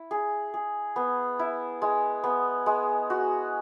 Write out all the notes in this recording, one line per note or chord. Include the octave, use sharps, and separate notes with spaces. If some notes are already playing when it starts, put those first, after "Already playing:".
Already playing: E4
G#4
G#4
B3
E4
G#3
B3
G#3
F#4